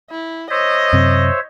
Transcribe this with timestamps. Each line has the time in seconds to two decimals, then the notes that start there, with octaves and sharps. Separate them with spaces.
0.10 E4
0.51 C5 C#5 D#5 E5
0.93 F#2 C3 C4